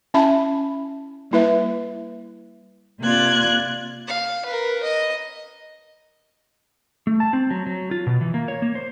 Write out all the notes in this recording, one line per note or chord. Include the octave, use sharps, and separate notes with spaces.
C#4 E4 E5 G#5 A5 B5
G3 A#3 E4 B4 E5
C3 A#3 F4 D5 F#6 G#6
F5
A#4 B4
D#5
A3
A5
C4
F#3
F#3
F4
B2
E3
A#3
C#5
A#3
C5